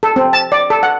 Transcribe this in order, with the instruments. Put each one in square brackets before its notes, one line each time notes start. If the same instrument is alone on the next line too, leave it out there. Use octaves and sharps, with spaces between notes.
[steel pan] A4
C4
A5
D5
A4
F#5